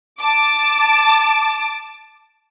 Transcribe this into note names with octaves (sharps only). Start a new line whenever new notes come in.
A5 D6